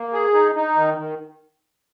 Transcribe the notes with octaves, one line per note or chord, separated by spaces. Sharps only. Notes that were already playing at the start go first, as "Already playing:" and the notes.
Already playing: A#3
G#4
D#4
D#4
D#3
D#3